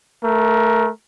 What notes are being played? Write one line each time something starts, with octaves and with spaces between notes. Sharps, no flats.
A3 A#4